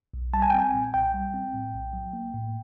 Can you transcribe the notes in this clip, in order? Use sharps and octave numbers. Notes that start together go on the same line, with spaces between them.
B1
G3 A5
G#5
G5
C4 G#5
A#2
B1 G5
G3
C4
A2
B1
F#3
A#3
A2